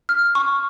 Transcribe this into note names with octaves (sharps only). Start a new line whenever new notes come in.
F6
C#6